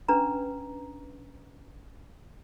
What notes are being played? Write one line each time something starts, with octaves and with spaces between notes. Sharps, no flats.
C#4 D4 B4 A#5